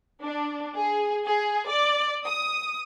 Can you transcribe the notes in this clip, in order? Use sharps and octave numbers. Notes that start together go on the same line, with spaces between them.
D4
G#4
G#4
D5
D#6